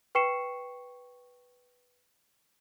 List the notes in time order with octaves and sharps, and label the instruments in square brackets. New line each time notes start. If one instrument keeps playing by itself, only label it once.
[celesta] B4 G5 C#6 C7 C#7 E7